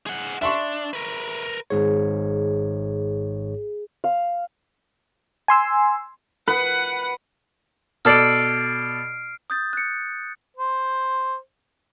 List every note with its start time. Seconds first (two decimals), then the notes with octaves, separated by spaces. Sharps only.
0.06 G#4 F#5
0.42 D4 E5 C6 C#6
0.93 A#4 B4
1.70 G#1 G#2 G#4 C#5
4.04 F5
5.48 G#5 C6 E6
6.48 B4 F#5
8.05 B2 A4 D5 F6 C7 D7
9.50 D#6 G6 A6
9.73 F#6 C#7
10.56 C5